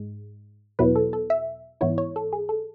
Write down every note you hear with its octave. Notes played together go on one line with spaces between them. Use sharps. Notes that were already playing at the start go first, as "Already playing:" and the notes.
Already playing: G#2 G#3
E2 B2 F#3 B3 E4 B4
A4
A4
E5
G#2 E3 B3 E4 C#5
C#5
A4
G#4
A4